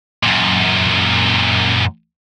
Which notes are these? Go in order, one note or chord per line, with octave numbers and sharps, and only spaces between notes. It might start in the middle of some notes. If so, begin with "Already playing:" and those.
F#2 A#2